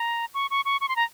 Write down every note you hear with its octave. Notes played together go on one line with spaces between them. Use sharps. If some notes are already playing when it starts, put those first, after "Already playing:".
Already playing: A#5
C#6
C#6
C#6
C#6
C6
A#5